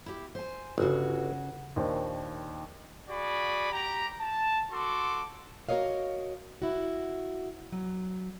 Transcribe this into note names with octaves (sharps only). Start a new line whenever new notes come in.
E4 G4
C5 G#5
G1 C#3 F#4 G#4
D#2 A#2 D#3 D4 D#4 C5
F#4 G#4 D5 B5
G4 A#5
A5
F#4 A4 C6 D6
F#4 A#4 C#5 D#5 F5
E4 F#4
F#3